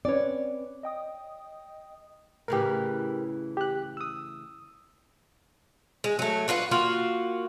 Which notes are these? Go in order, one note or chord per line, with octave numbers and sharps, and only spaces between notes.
C4 C#4 B4 C#5 D5
D#5 G5 D#6
A2 C#3 E3 G4 A#4
G4 F#6
D#6 E6
G#3
F#3 A3
D4 F4 F#4 B4
A#3 F4 F#4